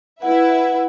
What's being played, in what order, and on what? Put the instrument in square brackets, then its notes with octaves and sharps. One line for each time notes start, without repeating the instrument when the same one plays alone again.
[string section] E4 B4 E5 [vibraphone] F#5